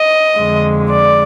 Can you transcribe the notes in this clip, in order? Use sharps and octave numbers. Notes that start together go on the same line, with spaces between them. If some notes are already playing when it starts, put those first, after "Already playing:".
Already playing: D#5
F2 D3 G#3
D5